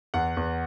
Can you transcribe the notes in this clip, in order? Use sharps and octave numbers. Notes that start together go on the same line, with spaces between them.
E2 F#5
E2